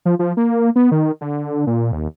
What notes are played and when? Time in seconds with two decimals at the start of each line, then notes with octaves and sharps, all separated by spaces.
0.05 F3
0.19 F3
0.37 A#3
0.76 B3
0.92 D#3
1.21 D3
1.67 A#2
1.92 D#2